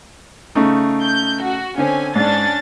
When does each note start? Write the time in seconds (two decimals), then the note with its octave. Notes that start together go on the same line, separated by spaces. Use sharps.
0.55 C#3 A3 D#4
1.02 G6
1.44 F#4
1.78 D3 C4 C#4 G#5
2.15 G#2 C#4 D4 A6